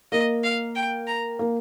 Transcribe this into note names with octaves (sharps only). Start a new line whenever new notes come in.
A#3 D#5
F5
G5
A#5
A#3